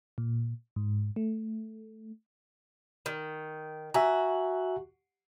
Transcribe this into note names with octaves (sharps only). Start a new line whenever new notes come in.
A#2
G#2
A3
D#3
F#4 E5 G#5 A#5